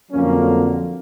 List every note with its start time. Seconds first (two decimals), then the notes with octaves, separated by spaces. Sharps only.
0.11 F2 D3 F#3 A#3 C#4